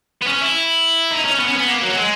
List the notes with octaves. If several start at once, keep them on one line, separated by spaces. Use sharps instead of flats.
B3
C#4
E4
D#4
C#4
B3
C#4
B3
A#3
F#3
A#3
G#3